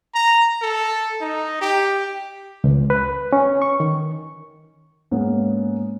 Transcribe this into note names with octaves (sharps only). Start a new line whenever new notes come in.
A#5
A4
D#4
G4
C#2
B4
C#4
C#6
D#3
G#2 A#3 B3 C#4